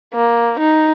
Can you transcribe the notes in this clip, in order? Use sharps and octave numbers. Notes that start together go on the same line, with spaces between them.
A#3
D#4